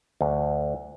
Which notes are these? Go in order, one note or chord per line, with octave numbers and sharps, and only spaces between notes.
D2